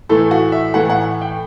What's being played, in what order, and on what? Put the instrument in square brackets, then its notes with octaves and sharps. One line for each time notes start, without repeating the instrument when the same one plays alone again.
[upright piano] A2 E3 A3 A4
F#4
E5
A2 E3 A3 F#5
F#5
G5